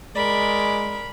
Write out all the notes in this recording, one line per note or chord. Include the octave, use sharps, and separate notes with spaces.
G#3 A#4 D5 B5